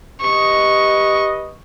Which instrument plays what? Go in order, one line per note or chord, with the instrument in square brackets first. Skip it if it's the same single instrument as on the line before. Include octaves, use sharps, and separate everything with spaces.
[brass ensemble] G4 B4 D#5 [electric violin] C#6